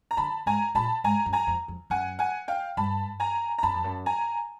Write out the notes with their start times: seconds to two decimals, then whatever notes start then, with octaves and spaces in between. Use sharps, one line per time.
0.11 A#5
0.17 D3 A5 B5
0.46 G#2 G#5 A#5
0.75 A#2 A5 B5
1.04 G#2 G#5 A#5
1.26 F#2
1.33 G#5 A#5
1.47 F2
1.68 F2
1.90 F#2 F#5 G#5
2.19 F#5 G#5
2.48 F5 G5
2.77 G2 A5 B5
3.20 G#5 A#5
3.58 A#5
3.63 F#2 A5 B5
3.74 F2
3.84 F#2
4.06 G#5 A#5